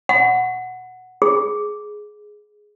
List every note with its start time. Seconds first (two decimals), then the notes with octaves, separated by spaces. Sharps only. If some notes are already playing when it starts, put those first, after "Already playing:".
0.09 F#5
1.22 G#4